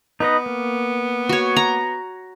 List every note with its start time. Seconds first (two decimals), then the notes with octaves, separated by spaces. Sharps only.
0.20 B3 D#4 B4 D#5
0.46 A#3
1.29 F#4 C#5
1.56 A#5